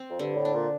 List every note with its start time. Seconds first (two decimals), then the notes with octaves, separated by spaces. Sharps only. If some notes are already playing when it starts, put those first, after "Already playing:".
Already playing: C4
0.10 F2
0.19 G2 D3
0.37 A2
0.45 D4
0.54 A#2